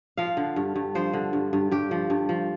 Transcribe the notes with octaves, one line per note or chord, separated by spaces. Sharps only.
F3 F5
D3
G2
G2
F3 C5
D3
G2
G2
G2 G4
F3
G2
F3